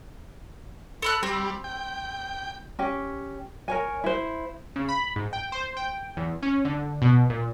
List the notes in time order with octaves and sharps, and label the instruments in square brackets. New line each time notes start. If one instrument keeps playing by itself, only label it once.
[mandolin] A4 B5 F#6
[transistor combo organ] G3 [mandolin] C4
[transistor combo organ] G5
[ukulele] C#4 G4
A#4 C#5 G#5
E4 C5
[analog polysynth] C#3
B5
G#2
G5
C5
G5
E2
C#4
D3
B2
A#2